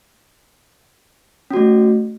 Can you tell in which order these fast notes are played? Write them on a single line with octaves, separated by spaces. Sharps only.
C#4 F#4 A3